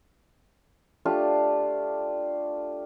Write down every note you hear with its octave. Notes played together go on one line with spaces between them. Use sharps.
A3 D4 F4 G4